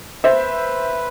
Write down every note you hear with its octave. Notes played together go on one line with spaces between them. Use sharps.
B4 C5 E5